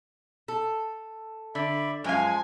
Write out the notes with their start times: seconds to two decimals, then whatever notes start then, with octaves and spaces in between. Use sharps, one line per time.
0.48 A4
1.55 D3 D5 E5 B5
2.04 F#2 F3 G#3 F5 G#5